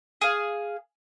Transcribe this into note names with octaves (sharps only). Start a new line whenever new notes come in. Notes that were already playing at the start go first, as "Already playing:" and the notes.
G#4 F5